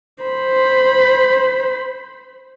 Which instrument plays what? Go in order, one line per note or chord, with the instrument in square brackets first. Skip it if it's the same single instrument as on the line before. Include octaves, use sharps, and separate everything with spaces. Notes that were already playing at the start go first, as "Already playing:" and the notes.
[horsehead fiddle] C5 B5